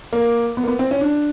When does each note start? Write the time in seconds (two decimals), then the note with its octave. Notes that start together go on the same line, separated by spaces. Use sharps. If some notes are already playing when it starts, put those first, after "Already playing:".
0.13 A#3
0.57 B3
0.63 A#3
0.68 B3
0.79 C4
0.91 C#4
1.01 D4